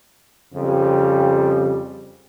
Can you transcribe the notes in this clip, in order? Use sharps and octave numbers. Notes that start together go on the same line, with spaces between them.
F2 C#3 G3